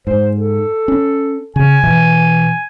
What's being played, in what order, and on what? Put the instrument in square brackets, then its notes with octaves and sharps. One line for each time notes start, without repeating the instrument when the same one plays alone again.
[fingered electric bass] G#2 [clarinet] C5
[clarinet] A4
[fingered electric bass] C#4
[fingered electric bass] C#3 [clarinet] G#5
[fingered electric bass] B2 E3